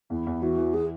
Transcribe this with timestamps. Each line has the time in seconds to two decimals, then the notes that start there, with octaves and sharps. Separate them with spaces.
0.10 E2 E4
0.27 E2
0.42 E3 F#4
0.57 E3
0.73 E3 G#4